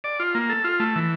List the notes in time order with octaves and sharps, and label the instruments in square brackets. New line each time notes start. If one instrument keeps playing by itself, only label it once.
[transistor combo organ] D5
F4
A#3
A4
F4
A3
E3